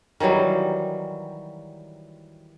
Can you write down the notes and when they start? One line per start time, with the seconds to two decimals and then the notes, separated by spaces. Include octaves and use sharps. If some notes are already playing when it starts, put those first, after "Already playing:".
0.20 D#3 E3 F#3 G3